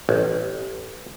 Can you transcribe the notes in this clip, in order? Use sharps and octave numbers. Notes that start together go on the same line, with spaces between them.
A1